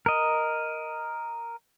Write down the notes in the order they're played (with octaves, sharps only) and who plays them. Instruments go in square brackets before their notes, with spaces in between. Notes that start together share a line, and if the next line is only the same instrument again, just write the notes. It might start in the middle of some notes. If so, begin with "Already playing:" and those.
[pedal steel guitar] A#4 D#5